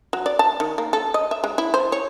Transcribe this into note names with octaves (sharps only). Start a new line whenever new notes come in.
F#3
D5
A5
D#3
A#3
A4
D#5
E5
G#3
E4
C5
C#5